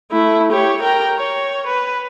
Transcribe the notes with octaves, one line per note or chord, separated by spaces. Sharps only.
A3 E4
G4 C#5
A#4 G5
C#5
B4